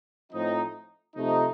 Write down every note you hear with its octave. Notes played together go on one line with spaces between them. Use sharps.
A2 F3 C4 D#4
C3 F3 A3 D#4